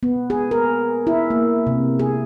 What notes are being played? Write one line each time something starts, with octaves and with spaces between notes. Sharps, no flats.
B3
G#4
A#4
E4
A#3
C3
G#4